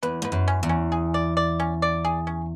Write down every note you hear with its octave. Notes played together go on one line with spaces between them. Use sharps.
E2 B4
G#2 B4
F#2
C#4
E2
C#4
G#4
D5
D5
C#4
D5
G#4
C#4